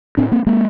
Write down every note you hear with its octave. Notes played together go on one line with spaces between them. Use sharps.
A2 C4 D4
A#3 C4
G#3 A#3